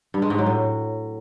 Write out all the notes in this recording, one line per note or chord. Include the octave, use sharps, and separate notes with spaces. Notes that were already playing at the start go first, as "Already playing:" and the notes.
G2
G#3
G#2
F#3
A2